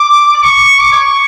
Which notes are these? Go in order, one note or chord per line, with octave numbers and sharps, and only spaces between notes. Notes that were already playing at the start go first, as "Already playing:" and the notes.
Already playing: D6
D6
C#6
D6
C#6